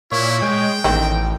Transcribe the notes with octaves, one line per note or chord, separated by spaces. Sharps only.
A#2 E4 C#5
G#3 G5
A1 D#3 B3 C4